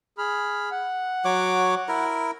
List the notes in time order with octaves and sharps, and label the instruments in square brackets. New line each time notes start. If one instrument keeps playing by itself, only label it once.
[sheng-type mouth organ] G#4 B5 F6
F#5
[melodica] F#3 C#5 D6
E4 A#4